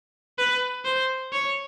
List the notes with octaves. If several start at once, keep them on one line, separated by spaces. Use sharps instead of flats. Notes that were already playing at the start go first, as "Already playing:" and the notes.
B4
C5
C#5